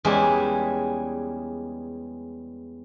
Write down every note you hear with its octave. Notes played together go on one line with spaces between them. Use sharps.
E2 G3 G#3 C#4 E5